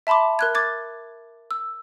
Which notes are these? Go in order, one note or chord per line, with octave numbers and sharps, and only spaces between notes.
E5 A5 B5 C6 D6
A#4 F#6 G#6
D6 G#6 A6
E6